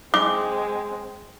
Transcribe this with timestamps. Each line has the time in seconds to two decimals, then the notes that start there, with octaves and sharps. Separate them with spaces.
0.14 G#3 C4 D6